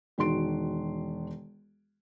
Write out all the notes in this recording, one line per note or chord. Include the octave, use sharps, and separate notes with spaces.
E1 D#3 F#4 C6 D7